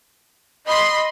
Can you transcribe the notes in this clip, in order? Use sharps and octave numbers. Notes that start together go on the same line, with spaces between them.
D#5 B5 C6